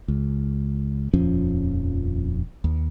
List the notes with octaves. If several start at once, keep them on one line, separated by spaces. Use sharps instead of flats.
C#2
D#1 F2 F3 C#4
D#2